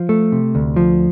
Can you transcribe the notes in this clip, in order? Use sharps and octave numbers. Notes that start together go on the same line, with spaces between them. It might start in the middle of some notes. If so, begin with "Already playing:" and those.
Already playing: F3
A3
C3
D2
F3